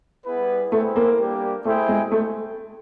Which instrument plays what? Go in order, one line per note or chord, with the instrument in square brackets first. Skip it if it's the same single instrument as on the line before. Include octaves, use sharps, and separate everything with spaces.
[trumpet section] G3 B3 E4 G#4 B4
[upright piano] A3 [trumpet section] E4 G#4 C5 E5 G5
[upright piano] A#3
[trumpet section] G3 A#3 D4 G4
[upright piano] A3 [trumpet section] E4 G#4 C5 E5 G5
[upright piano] G#3
A3